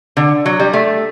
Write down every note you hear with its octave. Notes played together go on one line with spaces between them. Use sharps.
D3
F#3
G3
A3